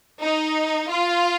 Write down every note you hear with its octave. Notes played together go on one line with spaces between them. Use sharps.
D#4
F4